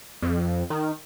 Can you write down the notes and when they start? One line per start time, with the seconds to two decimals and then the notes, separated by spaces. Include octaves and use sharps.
0.22 F2
0.70 D#3